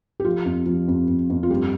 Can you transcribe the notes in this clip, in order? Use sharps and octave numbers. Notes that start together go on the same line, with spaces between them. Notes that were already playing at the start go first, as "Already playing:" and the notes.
G4
F3 F4
F2
F3
F2
F2
F2
F4
G2 G4